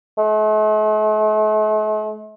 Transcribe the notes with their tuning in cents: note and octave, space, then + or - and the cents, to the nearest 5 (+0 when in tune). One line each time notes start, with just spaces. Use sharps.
A3 -45